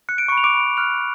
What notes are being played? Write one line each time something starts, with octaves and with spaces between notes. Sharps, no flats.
F#6 C#7
D7
B5 C#6 C#7
F7
D6 D7
B5
F6 F#6 F7